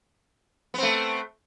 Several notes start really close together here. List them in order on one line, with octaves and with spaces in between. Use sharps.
B3 C4 A3